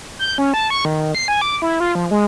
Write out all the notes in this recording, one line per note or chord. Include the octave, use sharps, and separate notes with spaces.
G6
C#4
A5
C#6
D#3
C7
G#5
D6
E4
F4
F3
G#3